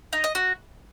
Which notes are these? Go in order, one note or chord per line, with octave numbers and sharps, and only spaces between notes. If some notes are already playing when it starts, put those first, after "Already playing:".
D#4
D#5
F#4